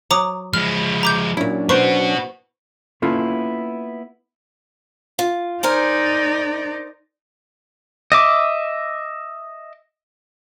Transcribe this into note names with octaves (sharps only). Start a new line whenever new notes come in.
F#3 A#5 D6 D#6
F3 G#3 B5 F6
A#5 D6 G6
A#2 F#3 C#4 D4 E4
B3 F#4 B4 C5 C#6
A#3 B3 C#4 E4 F4 A4
F4
D#4 A#4 C5 D5 G#5
D#5 E5 D6